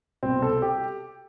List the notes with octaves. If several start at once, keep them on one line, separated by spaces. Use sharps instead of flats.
C2 B2 C4
A4
G4